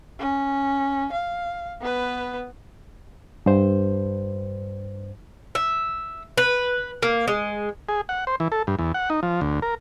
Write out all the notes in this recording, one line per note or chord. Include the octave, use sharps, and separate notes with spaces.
C#4
F5
B3 B4
G2 C5
E5
B4
A#3
G#3
G#4
F#5
C5
E3
A4
G2
E2
F#5
D#4
F3
D2
A#4